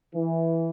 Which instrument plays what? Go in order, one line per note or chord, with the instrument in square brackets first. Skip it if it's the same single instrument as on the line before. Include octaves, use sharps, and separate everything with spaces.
[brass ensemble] E3